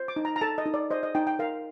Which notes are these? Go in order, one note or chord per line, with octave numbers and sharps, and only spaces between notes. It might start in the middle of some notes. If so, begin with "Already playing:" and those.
Already playing: C5
D6
D#4
A#5
A#5
A4 A5
D#5
D#4
D5
C5 D#5
D#5
D#4 G5
G5
A#4 F5